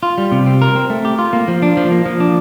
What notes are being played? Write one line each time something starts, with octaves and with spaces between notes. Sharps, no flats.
F4
G3
C3
C4
A#4
C4
A3
G4
F4
A#3
F3
D4
F3
A#3
F3
D4